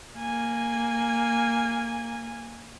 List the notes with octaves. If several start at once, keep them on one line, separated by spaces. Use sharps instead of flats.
A#3 G#5